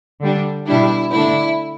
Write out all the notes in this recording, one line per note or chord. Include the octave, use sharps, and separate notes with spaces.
D3 G3 D4
B2 G3 D4 E4
D3 A3 D4 E4